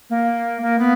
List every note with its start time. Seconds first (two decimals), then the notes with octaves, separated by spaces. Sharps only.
0.10 A#3
0.62 A#3
0.79 B3